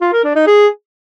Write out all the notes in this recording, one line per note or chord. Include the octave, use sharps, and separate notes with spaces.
F4
A#4
D4
D#4
G#4